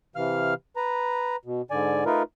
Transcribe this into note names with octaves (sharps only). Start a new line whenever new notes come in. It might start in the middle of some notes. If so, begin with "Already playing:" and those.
C3 E3 F5 F6
B4 A#5
B2
G#2 D3 D5 G#5
A3 D#4 F4 A#4 B4